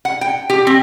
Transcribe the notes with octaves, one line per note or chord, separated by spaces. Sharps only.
F#5
G5
G4
C4